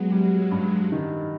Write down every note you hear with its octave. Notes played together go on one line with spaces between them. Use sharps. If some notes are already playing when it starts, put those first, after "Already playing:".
Already playing: F#3 G#3 B3
G3
G2
D#3